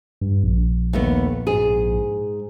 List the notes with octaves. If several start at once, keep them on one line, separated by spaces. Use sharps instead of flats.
G2
A#1
D#2 A3 B3
G#2 G#4